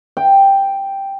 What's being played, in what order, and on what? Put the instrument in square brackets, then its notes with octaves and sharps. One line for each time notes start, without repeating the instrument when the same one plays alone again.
[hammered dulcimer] G5